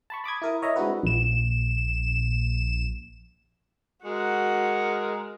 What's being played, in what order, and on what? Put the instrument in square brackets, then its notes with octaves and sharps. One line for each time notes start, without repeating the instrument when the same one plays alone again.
[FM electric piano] A5 B5 C#6
B5 D6 D#6 G#6
E4 A#4 D#6
C#5 D#5 E5 A#5
G#3 C4 D4 E4 F#4 B4
[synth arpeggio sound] A#1 E7
[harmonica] G#3 A#4 [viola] F#4 F#5